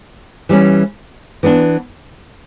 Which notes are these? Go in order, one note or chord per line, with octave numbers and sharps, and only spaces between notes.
E3 G3 C#4
E3 B3 D4